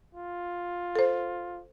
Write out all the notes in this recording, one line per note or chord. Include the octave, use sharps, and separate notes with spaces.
F4
A4 C5